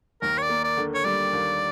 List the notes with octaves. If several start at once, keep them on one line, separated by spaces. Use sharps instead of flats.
D#2 A#4
C#5
D5
A#3
D5
D3
C#5
G3 D5
D#2